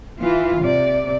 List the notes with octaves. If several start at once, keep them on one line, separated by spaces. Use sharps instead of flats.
E3 F4
C3 D5